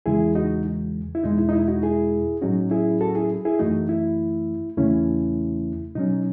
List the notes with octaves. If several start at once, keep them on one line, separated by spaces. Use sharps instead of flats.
E2 C#3 E3 G#3 E4 G#4
D#4 F#4
E4
E2 B2 G#3 D#4
E4
D#4
E4
D#4 F#4
E4 G#4
A2 F#3 C#4 D#4 F#4
E4 G#4
F#4 A4
E4 G#4
E4 G#4
F#2 E3 A3 D#4 F#4
E4
E2 C#3 E3 A3 C#4 E4
B2 F#3 C#4 D#4